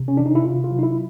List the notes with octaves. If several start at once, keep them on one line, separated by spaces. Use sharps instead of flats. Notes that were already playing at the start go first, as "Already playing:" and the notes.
Already playing: C3
C#4
D#3 D4
D#4
E4
C3 F4
F4
F#3
D#4
E4